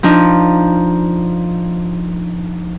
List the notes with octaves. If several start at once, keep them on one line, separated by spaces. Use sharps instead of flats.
F3 D4 D#4